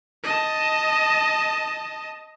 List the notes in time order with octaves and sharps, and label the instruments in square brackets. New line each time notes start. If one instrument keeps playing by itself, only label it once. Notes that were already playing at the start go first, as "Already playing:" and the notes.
[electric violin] D#5 A5